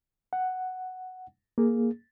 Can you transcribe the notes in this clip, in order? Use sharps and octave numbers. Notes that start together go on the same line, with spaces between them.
F#5
A#3 G#4